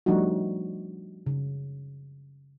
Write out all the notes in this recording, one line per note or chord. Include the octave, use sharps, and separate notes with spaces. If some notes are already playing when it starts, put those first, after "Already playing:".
F3 G3 A3 D4 D#4 F#4
C#3